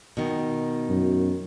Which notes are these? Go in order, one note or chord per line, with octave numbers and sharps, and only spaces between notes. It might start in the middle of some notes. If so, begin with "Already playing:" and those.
B2 D#3
F#2